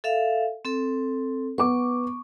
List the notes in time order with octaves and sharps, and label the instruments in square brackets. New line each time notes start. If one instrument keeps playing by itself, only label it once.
[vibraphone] A4 E5 F5
C4 A4
[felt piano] B3 D6 [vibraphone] C#6